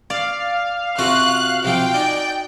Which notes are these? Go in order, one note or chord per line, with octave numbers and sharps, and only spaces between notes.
D5 F5
C3 F4 F#4 A4 F#6
C3 F3 A4 G5
D#4 D5 G#5